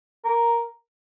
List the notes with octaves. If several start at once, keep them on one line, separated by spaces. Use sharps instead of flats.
A#4